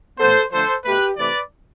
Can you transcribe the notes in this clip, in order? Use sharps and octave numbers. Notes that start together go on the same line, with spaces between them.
A2 E3 B3 A4 C5
D3 F3 A3 A4 C5
B2 A3 G4 B4
C3 E3 A3 B4 D5